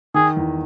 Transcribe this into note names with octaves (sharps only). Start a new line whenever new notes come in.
D#3 G#4
E2